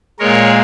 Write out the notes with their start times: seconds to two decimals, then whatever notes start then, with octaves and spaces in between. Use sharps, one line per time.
0.19 A#2 G#3 A#4 C#5